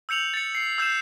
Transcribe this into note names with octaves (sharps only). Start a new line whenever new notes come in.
E6 G6 C#7 F7 F#7
A6 C#7
C7
E6 G6 C7 E7